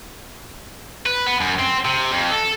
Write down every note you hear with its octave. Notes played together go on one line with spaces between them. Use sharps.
B4
B3
F#2
C4
C3
F2
A4